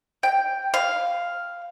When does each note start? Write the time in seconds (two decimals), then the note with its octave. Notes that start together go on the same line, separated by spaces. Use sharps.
0.23 G5
0.74 F5